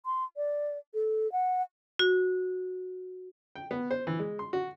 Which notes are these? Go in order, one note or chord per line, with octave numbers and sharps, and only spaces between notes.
C6
D5
A4
F#5
F#4
G5
B3
C5
E3
G#3
C6
F#4